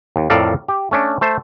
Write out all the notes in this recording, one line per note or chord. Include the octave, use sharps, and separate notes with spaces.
D#2
F2 A2 A4 A#4 D5 F5
G4
A3 C#4 D4
A3 C5 A5